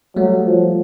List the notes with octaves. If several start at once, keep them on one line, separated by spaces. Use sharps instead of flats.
F#3 G3 A3
F3